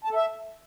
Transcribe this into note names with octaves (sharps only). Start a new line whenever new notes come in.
A5
A4
E5